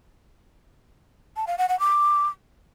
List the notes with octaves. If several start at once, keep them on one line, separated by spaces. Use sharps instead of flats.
A5
F5
F#5
F#5
D6